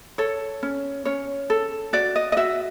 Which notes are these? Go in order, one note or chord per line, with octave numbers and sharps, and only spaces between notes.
A4 C#5
C#4
C#4 C#5
A4
F#4 D5
D#5
D#5
F#4 E5